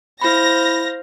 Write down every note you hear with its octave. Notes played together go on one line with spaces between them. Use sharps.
E4 C5 F5 B5 A#6